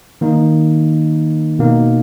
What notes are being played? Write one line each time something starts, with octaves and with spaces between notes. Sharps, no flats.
D#3 A#3 D#4
B2 A#3 D#4